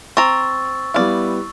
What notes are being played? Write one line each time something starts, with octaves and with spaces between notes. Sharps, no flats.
C4 A#5 C#6 E6 A6
G3 B3 E4 D5 F5